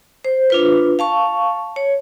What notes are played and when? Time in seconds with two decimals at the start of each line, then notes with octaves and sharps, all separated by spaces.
0.25 C5
0.50 D4 F4 B4
0.99 F5 A5 C#6
1.76 C#5